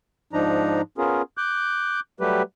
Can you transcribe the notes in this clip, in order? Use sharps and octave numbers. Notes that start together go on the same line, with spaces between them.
G#2 F3 D4 D#4 A#5
B3 C#4 F4 G#4 A#4
D6 F#6 G6
F#3 G3 A3 G4 B4